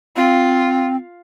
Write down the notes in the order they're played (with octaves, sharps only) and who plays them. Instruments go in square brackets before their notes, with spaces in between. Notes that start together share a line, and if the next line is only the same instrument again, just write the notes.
[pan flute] C4 [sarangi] F4